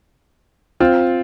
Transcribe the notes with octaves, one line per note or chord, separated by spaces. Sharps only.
C4 F4